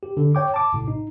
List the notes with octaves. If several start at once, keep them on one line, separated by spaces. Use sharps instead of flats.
G4
D3
C#5 G5 D6
A5 D6
A#1 A2 C3
D#4